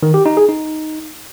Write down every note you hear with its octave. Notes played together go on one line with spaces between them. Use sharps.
D#3
G4
D#4
G#4
D#4